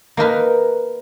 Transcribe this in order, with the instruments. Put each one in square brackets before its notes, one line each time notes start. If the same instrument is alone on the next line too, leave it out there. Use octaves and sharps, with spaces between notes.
[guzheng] A#3 D#4 A#4 B4